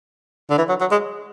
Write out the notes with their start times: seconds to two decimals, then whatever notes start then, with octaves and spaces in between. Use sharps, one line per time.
0.50 D3
0.58 E3
0.69 F#3
0.81 F#3
0.91 G#3